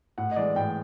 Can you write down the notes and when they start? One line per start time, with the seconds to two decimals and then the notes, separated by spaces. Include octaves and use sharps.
0.18 A2 F#5
0.31 D#5
0.36 E3 G#3 D5
0.56 A2 G5